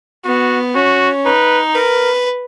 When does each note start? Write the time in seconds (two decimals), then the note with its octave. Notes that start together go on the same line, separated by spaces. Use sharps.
0.25 B3 F#4
0.75 C#4 F#4
1.25 D#4 B4
1.75 A#4 B4